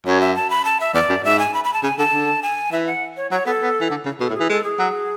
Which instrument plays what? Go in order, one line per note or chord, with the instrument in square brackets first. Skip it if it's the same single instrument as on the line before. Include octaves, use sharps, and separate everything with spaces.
[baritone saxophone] F#2 [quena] C#5
[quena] E5
A5
B5
A5
E5
[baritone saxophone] E2 [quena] D5
[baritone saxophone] F#2
[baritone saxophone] G#2 [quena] E5
[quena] G#5
B5
B5
A5
[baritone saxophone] C#3 [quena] G#5
[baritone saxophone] D3 [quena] A5
[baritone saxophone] D3
[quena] G#5
[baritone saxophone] E3 [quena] E5
[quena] F#5
C#5
[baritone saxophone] F#3 [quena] C#5
[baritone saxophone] B3 [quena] A4
[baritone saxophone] B3
E3
D3
C#3
[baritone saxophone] B2 [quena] A4
[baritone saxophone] A2
[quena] G#4
[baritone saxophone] E3
[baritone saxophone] G#3 [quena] A4
[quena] G#4
[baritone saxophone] F#3